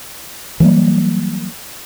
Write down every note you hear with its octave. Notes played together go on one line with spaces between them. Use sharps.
E3 F#3 G3 A#3